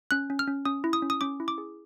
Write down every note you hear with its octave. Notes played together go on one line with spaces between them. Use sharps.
C#4 F#6
C#4
F6
C#4
C#4 D#6
E4
D#6
C#4
D#6
C#4 D6
E4
D6
G#4